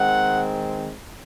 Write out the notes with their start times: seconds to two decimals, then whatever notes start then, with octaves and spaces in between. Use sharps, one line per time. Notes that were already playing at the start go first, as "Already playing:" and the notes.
Already playing: D#3 G#3 C4 F#5